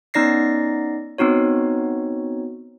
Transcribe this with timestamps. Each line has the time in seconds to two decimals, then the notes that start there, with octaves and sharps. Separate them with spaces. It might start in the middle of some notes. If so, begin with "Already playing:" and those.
0.14 B3 C#4 D#4 D5 A#6 C7
1.18 B3 C4 D#4 F#4 C#5